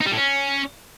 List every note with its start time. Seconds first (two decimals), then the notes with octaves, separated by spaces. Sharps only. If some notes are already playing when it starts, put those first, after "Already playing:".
0.01 D#4
0.06 G3
0.12 A2
0.18 C#4